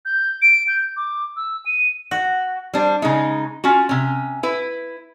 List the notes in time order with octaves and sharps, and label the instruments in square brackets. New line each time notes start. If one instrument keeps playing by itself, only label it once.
[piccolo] G6
D7
G6
D6
E6
D#7
[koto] F#4
[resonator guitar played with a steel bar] G3 D4 C5
C#3 G#3 D#4
C#4 F4 F#4
C3 C#4
E4 B4